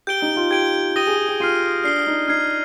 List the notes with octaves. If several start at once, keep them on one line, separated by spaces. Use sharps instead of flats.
G4 G6 D7 G7
D#4
F4
G4 G#6 D7 G7
G4 D#6 A#6 D#7 G7
G#4
G4
G4
F4 F6 C7 D#7
D4 F6 C7 G7
D#4
D#4 F6 G#6 C7